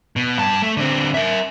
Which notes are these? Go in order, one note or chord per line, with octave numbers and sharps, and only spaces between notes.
B2
G2 A5
A3
D3 C4
A#4 E5